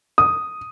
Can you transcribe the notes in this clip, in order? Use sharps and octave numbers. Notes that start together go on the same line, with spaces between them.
D#6